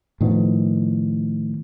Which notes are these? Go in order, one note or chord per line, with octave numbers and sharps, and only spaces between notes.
A2 D#3 F3 B3